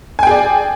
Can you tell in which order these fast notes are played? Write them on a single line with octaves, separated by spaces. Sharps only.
G#5 G5 G#4 D5